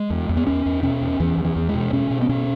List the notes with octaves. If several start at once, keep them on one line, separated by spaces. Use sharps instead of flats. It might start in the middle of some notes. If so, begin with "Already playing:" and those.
Already playing: G#3
E2
E2
B3
E2 C#4
E2
B2 C#4
E2
E2 E3
E2
E3
E2
G#3
B2
B2 C#4
B2
B3
B2 C#4